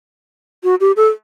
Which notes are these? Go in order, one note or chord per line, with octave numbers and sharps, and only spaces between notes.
F#4
G4
A4